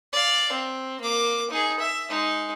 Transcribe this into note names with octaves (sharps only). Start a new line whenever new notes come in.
D5 F5
C4
A#3 D6
D#4 G#4
E5
G#3 D#4